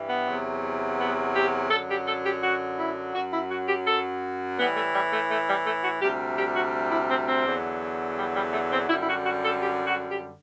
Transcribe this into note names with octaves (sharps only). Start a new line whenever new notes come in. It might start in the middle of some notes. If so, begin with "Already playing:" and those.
Already playing: G2 E3
B3
E2 C3 F#3
B3
G4
F#2 D3 F#3 A4
G4
A4
G4
F#4
E4
F#2 F#3 F#4
E4
F#4
G4
A4
A2 E3 G3 B3
A3
G3
A3
A3
G3
A3
F#4
D2 C3 G3 G4
G4
F#4
E4
C4
C4
E2 D3 F#3
G3
G3
A3
C4
F#2 D3 G3 E4
E4
F#4
F#4
A4
G4
F#4
G4